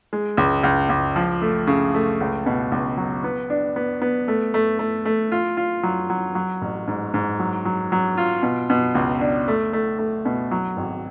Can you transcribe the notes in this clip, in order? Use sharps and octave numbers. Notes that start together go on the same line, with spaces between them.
G#3
C#2
C#2
C#2
F3
A3
C#3
A3
C#2
B2
C#2
F#3
B3
D4
B3
B3
A3
A3
A3
A3
F4
F4
F#3
F#3
F#3
A1
G#2
G#2
F#3
F#3
F#3
F4
B2
B2
C#2
D4
A3
A3
A3
B2
F#3
G#1